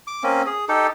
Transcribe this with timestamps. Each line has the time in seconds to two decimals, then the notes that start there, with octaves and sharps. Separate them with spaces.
0.07 D6
0.23 A#3 C4 C#4
0.46 G#4
0.69 D#4 G4 A4